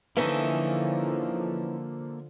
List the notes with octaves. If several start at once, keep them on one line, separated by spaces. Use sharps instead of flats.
D3 E3 F3 A#3 C#4 D#4 A4 E5